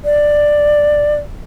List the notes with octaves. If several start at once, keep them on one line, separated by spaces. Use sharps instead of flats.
D5